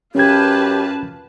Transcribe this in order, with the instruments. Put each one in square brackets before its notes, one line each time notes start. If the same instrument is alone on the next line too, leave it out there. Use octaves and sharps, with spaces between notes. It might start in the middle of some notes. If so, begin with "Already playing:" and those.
[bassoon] F#2 [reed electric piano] C#4 G#6 [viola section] F4 B4 A5 [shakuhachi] G4